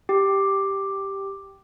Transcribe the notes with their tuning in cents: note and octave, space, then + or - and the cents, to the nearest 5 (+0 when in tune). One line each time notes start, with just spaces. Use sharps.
G4 +0 G5 -10